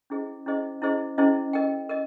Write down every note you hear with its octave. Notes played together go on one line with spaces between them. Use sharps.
C#4 E4 G#4 C5 D#5
C#4 E4 G#4 C5 D#5
C#4 E4 G#4 C5 D#5
C#4 E4 G#4 C5 D#5
A#4 D#5 G5
A#4 D#5